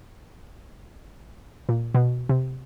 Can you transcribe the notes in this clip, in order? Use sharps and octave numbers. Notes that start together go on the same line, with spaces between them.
A#2
B2
C3